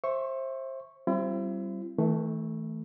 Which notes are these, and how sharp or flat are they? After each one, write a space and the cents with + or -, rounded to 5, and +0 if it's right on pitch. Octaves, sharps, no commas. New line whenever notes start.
C5 +25 E5 +0 C#6 -5
G3 -20 C4 +10 E4 +45
E3 -40 A3 +0